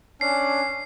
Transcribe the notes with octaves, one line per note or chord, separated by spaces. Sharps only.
C#4 D4 G#5 C7